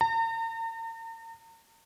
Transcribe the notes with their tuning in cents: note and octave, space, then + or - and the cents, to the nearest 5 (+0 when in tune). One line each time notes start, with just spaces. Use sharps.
A#5 -45